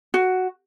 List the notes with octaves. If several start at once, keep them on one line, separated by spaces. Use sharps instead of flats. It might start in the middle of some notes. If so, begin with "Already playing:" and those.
F#4